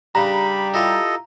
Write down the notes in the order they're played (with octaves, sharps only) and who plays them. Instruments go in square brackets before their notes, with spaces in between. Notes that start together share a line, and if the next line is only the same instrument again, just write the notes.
[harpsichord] C#3 D4 [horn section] G3 [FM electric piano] A#5 [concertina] B5
[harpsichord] E4 F4 G4 [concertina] A4 D#5